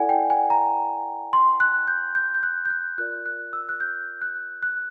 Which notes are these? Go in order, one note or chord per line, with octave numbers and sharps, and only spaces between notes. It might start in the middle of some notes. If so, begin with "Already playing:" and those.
Already playing: E4 A4 D5 F#5 G#5
G5
G#5
A#5
C6
F#6
G6
G6
G6
F#6
G6
F#6
F4 A#4 D5 F#6
F#6
E6
F#6
G6
F#6
F#6